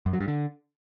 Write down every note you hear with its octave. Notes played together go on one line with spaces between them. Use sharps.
F#2
F#3
G2
D3